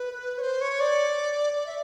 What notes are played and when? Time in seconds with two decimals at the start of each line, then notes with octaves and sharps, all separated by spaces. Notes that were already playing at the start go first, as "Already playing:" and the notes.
Already playing: B4
0.38 C#5
0.42 C5
0.61 C#5
0.80 D5
1.56 D5
1.66 E5